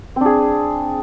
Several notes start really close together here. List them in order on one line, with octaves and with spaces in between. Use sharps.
C4 D4 G#4